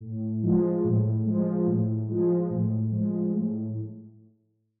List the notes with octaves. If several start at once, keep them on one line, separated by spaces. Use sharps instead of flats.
A2
F3 G#3
A2
F3 G#3
A2
F3 G#3
A2
F3 G#3
A2